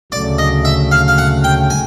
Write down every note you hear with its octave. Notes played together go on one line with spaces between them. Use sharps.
D2 C#3 F#3 A3 D5
D#5
E5
F5
F5
F#5
G5
G#5